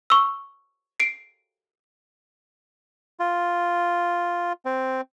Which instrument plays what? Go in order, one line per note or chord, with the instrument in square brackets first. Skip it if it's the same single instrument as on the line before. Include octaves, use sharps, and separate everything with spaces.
[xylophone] C#6 E6
C7 D7
[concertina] F4
C4